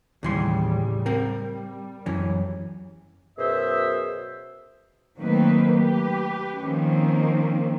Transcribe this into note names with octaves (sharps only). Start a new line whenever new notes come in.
D#2 A2 C#3 E3 G3 C6
G3 C4 A#4
F#2 E3 C#4
F#2 B2 G#4 C5 E5
D#3 F#3 A3 A#3 C4 B4
G4 B4
D#3 F3 A#3 C4 C#4